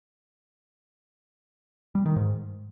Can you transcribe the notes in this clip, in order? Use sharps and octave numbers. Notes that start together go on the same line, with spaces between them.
G3
D#3
G#2